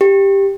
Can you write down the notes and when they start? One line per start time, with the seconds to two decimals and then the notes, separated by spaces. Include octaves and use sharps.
0.01 G4